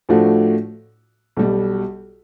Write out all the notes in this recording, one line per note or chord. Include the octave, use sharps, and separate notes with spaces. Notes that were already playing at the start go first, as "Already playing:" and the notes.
A2 F3 A3 D4 F#4
B1 B2 G3